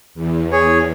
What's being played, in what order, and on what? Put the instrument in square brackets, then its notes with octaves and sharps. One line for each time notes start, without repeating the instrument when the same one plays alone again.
[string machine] E2
[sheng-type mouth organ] G#4 C#5